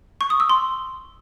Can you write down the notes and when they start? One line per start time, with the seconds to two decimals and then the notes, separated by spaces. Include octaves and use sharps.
0.21 C#6
0.30 D#6
0.40 E6
0.50 C6